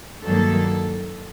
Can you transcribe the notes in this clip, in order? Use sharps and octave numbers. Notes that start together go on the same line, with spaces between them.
G2 D#3 F#3 A#3 A4